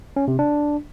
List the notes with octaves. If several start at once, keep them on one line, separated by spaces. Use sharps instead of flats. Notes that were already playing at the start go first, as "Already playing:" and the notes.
C#4
C3
D4